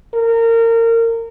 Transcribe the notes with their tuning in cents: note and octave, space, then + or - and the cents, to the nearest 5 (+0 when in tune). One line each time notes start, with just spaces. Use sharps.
A#4 -25